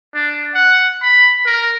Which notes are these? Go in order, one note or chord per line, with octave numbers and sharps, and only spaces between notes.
D4
F#5
B5
A#4